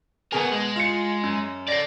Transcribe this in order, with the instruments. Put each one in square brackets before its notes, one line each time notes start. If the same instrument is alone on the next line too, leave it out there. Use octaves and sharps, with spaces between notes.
[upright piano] B2 G#4 [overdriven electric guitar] A#3 B3
[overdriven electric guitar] G#3
[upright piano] F4 C#7
F#2
[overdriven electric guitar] A4 D5 [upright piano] A#6 C7